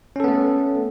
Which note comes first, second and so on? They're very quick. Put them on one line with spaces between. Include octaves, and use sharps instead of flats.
C#4 A4 B3 A3